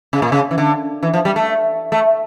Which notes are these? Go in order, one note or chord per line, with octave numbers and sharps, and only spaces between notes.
C#3
A#2
C#3
E3
D3
E3
F3
G3
A3
A3